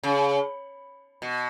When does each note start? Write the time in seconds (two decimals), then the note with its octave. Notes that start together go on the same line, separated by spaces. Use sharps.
0.03 C#3
1.22 B2